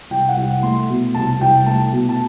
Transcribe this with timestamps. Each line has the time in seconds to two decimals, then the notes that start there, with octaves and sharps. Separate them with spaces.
0.10 C2 G5
0.29 F#5
0.36 C2
0.63 A3 C6
0.89 B2
1.15 C2 A5
1.41 C2 G5
1.66 A3 A5
1.92 B2
2.09 A5